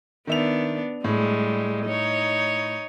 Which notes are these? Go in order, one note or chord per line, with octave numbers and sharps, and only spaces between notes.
D#3 B3 D4 E5 F7
A2 G3 G#3
D#4 C#5